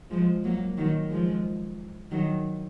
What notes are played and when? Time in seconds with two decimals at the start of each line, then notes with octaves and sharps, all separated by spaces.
0.10 F3 G#3
0.43 F#3 A#3
0.78 D#3 F#3
1.10 F3 G#3
2.11 D#3 F#3